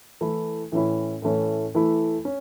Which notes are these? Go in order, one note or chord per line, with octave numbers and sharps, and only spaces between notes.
E3 A3 E4
A2 E3 C#4 E4
A2 E3 A3 C#4
E3 A3 E4
C#4